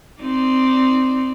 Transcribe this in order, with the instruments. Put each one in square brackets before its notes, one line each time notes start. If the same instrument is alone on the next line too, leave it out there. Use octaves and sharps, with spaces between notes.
[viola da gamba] C4 D#4 D5